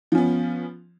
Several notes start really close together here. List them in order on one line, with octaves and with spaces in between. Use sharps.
F3 C#4 B3